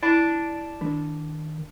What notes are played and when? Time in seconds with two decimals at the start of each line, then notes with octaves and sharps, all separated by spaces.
0.03 E4 D5 A5 B5
0.81 D#3 D4